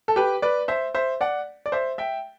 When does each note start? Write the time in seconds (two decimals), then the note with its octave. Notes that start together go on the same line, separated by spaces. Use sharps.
0.08 A4
0.16 G4 B4
0.42 B4 D5
0.68 C5 E5
0.95 C5 E5
1.21 D5 F#5
1.66 D5
1.72 C5 E5
1.98 E5 G5